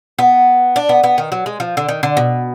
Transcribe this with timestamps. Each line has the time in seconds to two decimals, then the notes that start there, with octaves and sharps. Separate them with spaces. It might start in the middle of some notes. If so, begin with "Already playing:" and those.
0.19 B3
0.76 D4
0.89 B3
1.04 B3
1.18 D#3
1.32 F#3
1.46 G#3
1.60 F3
1.77 D3
1.89 D#3
2.03 D3
2.17 B2